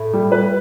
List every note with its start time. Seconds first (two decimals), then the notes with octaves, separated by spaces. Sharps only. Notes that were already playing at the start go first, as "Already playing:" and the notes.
Already playing: A2 A3
0.13 G3
0.32 B4